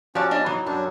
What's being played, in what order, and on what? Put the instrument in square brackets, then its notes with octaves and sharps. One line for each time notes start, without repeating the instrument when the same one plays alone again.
[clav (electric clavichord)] F3 G4 A5 [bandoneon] C#4 [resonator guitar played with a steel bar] F#4 D5
[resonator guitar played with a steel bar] D4 D#5
[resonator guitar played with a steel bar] E3 [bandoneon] F#3 D#4
[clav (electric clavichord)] F#2 [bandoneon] F#3 D4 [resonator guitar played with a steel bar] G3